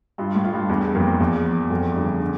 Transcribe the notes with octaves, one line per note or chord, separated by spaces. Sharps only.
G2 F4
A2
F4
G2
E2 G2
F2 A#3
E2 F3
F3
F2 A3
G2 D3
D3